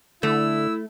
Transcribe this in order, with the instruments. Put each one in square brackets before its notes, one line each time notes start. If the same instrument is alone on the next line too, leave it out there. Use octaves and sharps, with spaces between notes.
[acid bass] D3 [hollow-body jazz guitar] A3 [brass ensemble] E4 [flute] E6